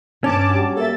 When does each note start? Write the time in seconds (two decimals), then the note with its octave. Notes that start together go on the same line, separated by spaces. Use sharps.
0.24 G2 C#4 A5 D6
0.50 F#3 G3
0.77 A#3 A4 E5 A5 A6